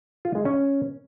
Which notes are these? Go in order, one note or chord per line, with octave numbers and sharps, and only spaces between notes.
F4
G#3
C#4